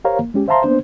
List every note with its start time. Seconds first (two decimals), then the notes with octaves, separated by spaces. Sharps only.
0.04 G4 A#4 C5 C#5 F5 A#5
0.19 A#3
0.34 G#3 C#4 G4
0.48 C5 E5 F5 A5 A#5 C6
0.63 A#3 B3 D4 C5